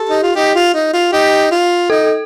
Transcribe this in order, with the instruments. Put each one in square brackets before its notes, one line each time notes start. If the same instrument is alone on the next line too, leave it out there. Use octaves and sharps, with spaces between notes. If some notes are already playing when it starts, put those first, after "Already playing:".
Already playing: [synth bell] G4 [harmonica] A4
[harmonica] D#4
F4
D#4 G4
F4
D#4
F4
D#4 G4
F4
[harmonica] D#4 [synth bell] A4